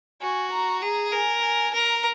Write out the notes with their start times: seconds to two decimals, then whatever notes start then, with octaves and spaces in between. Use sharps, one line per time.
0.21 F#4 G#5
0.52 A#5
0.82 G#4 A#5
1.13 A#4 G#5
1.43 G#5
1.73 A#4 A#5